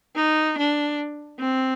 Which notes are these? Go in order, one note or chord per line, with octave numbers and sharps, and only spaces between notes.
D#4
D4
C4